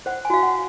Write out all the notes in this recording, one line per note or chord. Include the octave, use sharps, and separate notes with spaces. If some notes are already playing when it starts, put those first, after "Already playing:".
C5 F#5
G#5
F#4 F5
F#5